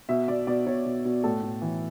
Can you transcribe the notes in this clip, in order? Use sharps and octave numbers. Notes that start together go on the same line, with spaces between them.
B2 E5
B2 D5
B2 D5
B2 C#5
B2
B2
A2 A4
A2
E3